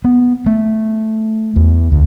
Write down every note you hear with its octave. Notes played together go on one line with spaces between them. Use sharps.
B3
A3
E2
D2